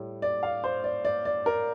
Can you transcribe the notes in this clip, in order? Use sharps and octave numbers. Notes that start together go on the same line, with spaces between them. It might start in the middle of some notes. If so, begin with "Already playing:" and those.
Already playing: A2 G3
D5
F5
C5
D5
D5
D5
A#4